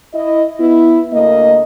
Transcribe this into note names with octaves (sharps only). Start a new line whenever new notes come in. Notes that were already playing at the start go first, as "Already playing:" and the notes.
E4 D#5
B3 E4
D2 A#3 D#5